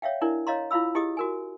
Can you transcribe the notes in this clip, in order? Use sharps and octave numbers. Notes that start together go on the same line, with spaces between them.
C#5 E5 F5 G5
D4 E4 A#4 D5
C#5 D#5 F5 A#5 C6
E4 F4 F5 B5 E6
E4 G4 G#4 D#5 D#6
F#4 A#4 G#5